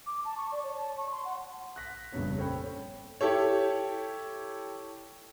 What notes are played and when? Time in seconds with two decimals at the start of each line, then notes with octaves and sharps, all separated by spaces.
0.06 D6
0.25 A5
0.37 C#6
0.52 D5
0.64 C#5
0.77 A5
0.97 C#6
1.12 C6
1.25 F#5
1.76 F#6 A#6 B6
2.12 F1 A#1 G2 C#3 B3 C#5
2.37 C#4 A4 C5 C#5 G5 B5
3.21 E4 G4 A4 C#5